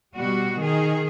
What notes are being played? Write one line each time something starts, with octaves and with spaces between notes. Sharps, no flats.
B2 G3 F#4
D#3 G#4